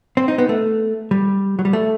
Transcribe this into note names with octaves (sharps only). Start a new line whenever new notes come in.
C4
D#4
B3
A3
G3
F#3
G3
A3